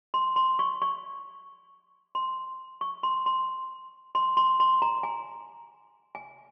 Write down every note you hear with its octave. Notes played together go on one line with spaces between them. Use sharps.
C6
C6
C#6
C#6
C6
C#6
C6
C6
C6
C6
C6
A#5
G#5
G#5